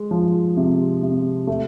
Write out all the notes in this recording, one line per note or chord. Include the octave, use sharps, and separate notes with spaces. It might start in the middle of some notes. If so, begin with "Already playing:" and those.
Already playing: G#3
F3
C3
C3
A3